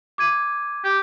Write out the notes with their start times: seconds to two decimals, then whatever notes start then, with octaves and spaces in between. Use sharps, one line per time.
0.18 D6 G#6 D#7
0.85 G4